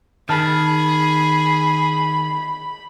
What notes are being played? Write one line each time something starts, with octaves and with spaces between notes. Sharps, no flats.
D#3 G#4 A5 B5 F6